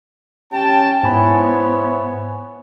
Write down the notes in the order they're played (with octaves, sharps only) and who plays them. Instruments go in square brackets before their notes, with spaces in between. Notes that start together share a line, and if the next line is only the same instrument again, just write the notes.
[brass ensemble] C#4 G4 A5 [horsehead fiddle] G5
[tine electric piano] G#2 G#5 B5 [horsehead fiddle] B3 [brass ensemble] E4 C5 C#5